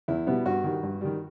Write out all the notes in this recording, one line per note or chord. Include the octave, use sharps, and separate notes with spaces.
E2 E4
B2 G3 B3
G2 F#4
D#3 G3
G2
D#3 G3